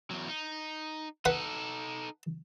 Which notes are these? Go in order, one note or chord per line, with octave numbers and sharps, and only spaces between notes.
E2 F#3
D#4
D#4 A4 B4 F#5